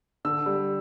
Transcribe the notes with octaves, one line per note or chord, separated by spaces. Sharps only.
D3 E6
G3